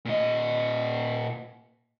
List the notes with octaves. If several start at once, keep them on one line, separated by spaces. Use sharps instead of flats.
A#2 D#5